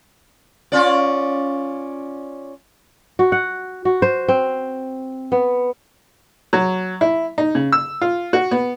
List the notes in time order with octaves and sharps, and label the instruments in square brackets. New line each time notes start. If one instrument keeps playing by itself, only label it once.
[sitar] C#4 F4 D5
[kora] F#4
F#5
F#4
C5
C4
B3
[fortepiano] F#3
E4
D#4
C#3
E6
F4
F#4
B3